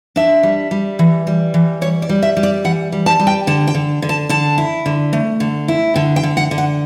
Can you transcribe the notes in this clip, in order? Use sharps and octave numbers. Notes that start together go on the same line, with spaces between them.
D4 E5
G3
G3
E3
G3
E3
G3 C#5
D5
G3
E5
G3
D5
E3 F#5
G3
A5
G3
G5
D3 A5
G5
D3
D3
A5
D3 A5
E4
D3
A3
D3
E4
D3 G5
G5
D3
F#5
D3
F#5